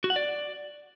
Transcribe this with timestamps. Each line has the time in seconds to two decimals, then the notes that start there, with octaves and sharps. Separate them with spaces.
0.04 F#4
0.10 F#5
0.16 D5